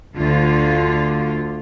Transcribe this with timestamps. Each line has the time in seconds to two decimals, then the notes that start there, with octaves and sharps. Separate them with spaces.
0.16 D2 D3 F4